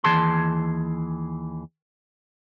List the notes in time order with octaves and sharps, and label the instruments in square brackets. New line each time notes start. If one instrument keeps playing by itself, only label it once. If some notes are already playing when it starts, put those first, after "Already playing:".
[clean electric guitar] D#2 E3 G#4 A5 C6